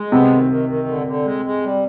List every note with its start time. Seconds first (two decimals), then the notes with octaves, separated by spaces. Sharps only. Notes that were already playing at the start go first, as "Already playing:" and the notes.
Already playing: G#3
0.12 C3 B3
0.31 D#3
0.50 D#3
0.69 D#3
0.88 D3
1.07 D3
1.26 G#3
1.45 G#3
1.64 G3